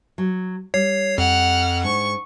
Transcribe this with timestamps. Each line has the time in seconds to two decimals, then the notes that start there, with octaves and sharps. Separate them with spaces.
0.18 F#3
0.74 G3 C#5 C7
1.18 F2 F#5 F6
1.83 G#2 D4 C#6